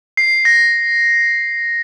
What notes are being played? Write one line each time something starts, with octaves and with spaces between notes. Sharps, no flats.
C7
A#6